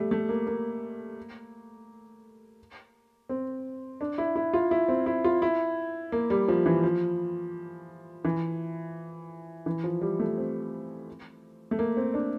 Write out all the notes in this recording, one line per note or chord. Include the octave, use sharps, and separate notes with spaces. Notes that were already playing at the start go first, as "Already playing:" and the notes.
Already playing: G3 A3
A3
A#3
A#3
C4
D4
E4
E4
F4
E4
C4
E4
F4
E4
A#3
G3
F3
E3
F3
E3
E3
F3
G3
A3
C4
A3
A#3
C4
D4